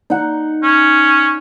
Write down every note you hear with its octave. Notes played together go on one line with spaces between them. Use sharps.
D#4 F#5
C#4